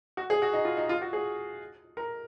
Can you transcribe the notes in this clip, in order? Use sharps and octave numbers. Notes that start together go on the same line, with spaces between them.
F#4
G#4
F#4
D#4
F4
D#4
F4
F#4
G#4
A#4